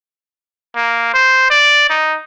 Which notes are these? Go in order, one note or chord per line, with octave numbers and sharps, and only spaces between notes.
A#3
C5
D5
D#4